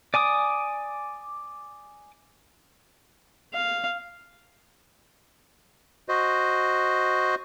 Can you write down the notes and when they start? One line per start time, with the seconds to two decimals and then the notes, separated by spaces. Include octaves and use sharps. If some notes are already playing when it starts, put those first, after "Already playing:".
0.14 D5 G#5 D6 D#6
3.54 F5
6.09 F#4 C5 D#5